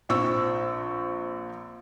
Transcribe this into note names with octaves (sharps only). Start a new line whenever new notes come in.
A#1 C4 C#6 E6